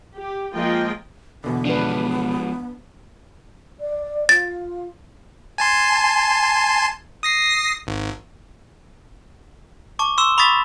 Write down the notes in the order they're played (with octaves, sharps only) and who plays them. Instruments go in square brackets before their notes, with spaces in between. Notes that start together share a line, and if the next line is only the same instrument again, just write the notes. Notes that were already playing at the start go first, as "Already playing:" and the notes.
[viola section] G4
F3 G#3 A#3 F4 D#5 G5
[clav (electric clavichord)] E2 B2 D3 [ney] B3
[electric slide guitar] F3 G#3 [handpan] D4 B4
[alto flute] D5
[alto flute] F4 [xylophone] A6
[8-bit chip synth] G#5 A5 C6
D#6 A#6 C7
G#1
[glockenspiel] A5 C#6 D6
C6 C#6 E6 E7 G7
B5 C#6 D#6 A6 B6